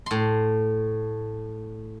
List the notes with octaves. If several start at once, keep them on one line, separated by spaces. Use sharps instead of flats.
A2 C6